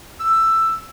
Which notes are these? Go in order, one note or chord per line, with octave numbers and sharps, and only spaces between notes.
E6